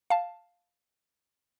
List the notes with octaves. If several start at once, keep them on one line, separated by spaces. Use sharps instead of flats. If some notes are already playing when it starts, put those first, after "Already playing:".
F5 A5